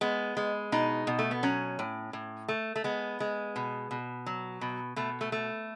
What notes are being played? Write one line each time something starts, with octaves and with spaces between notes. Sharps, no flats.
G#3 B3
G#3
B2 D#4
B2
A3
B3
F#3 C#4
A2
A2
A3
A3
G#3 B3
G#3
B2
B2
F#3
B2
B2 A3
A3
A3